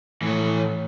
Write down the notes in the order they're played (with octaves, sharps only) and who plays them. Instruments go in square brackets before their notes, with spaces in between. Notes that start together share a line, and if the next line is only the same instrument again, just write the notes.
[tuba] A2 [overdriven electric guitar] E3 C#5